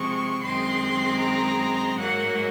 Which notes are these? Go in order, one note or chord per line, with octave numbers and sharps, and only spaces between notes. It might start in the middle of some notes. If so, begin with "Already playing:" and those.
Already playing: C3 F3 G#3 C4 C#6
F#2 D#3 G#3 C4 C6
A#5
G#2 F#3 A#3 F#5